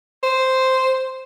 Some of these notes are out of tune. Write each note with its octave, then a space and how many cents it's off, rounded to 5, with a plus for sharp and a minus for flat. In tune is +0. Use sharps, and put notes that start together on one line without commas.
C5 -5